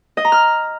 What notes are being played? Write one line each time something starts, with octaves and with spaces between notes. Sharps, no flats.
D#5
A#5
F6